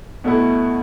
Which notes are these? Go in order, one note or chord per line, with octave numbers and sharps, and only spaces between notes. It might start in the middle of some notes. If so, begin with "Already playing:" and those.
B2 A3 E4